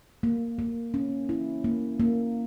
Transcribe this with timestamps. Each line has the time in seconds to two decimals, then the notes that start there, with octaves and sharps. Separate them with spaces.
0.23 A#3
0.59 A#3
0.94 C#4
1.29 E4
1.64 A#3
2.00 A#3